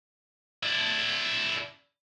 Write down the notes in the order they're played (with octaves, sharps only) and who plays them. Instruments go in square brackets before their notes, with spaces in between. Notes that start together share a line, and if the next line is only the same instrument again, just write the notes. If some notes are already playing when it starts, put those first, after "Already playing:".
[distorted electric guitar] D4 E4